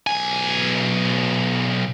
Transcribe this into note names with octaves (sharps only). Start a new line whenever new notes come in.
B1 G#5